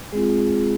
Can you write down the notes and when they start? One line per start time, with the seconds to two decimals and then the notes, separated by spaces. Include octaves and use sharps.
0.12 G#3 C4 F4 G#4